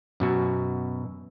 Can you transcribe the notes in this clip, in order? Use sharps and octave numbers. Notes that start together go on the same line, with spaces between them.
F#2 B2 F#4